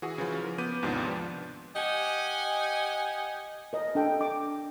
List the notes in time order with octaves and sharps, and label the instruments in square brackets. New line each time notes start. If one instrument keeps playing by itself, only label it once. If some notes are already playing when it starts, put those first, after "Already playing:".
[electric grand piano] E3 F#4 G#4
C#3 E3 F3
A#4
B3 D6 G6 D#7
D#2 G#2 C3 F3 B3 D4
[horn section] G4 D#5 F#5 G#5
[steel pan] A#4 D#5
D4 A4 G5
D6